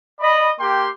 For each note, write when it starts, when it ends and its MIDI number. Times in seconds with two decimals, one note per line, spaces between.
0.19 0.48 74
0.19 0.48 75
0.19 0.48 83
0.58 0.87 58
0.58 0.87 67
0.58 0.87 79
0.58 0.87 84